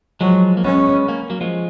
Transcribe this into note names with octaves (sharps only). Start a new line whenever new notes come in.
F3 F#3 G#3
A#3
G#3 B3 C#4
A#3 C#4
F#3 A#3
F3 G#3